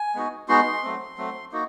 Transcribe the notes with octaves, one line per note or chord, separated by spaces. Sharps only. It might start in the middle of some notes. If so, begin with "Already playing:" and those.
Already playing: G#5
G#3 B3 D#4 F#4
G#3 B3 D#4 F#4 C6
F#3 A3 C4
F#3 A3 C4
A#3 D#4 F#4